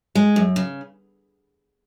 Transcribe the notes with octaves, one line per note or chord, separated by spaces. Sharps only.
G#3
F#2
C#3